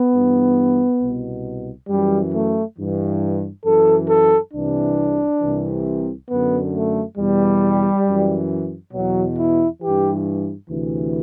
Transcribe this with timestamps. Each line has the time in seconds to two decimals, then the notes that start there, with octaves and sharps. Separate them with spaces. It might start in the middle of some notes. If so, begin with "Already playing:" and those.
Already playing: B3
0.13 G2 E3
1.02 C2 B2
1.89 F#2 E3 G3
2.34 A3
2.78 G2 E3
3.66 F#2 E3 A4
4.10 A4
4.54 C2 C3 E3 D4
5.41 C2 C3 E3
6.29 F#2 D3 B3
6.74 A3
7.18 E2 B2 G3
8.06 F#2 E3
8.94 E2 B2 F#3
9.38 E4
9.82 G2 E3 G4
10.69 D2 C3 E3